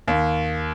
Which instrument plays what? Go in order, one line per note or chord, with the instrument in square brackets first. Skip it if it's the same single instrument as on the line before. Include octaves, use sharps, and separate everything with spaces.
[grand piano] D#2